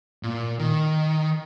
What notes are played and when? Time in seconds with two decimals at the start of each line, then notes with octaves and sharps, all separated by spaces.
0.23 A#2
0.59 D#3